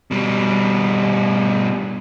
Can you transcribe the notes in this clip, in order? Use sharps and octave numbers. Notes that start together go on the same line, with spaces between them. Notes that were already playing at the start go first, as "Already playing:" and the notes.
B2 G3